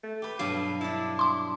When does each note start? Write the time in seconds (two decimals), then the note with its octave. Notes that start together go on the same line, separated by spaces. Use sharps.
0.03 A3
0.22 G4 B4
0.39 G2 B2 F#3 F5
0.81 D4 E4 A5
1.19 C6 D6